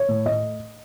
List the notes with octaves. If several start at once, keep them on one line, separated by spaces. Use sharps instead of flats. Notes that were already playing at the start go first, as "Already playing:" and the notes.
Already playing: C#5
A2
A3 D#5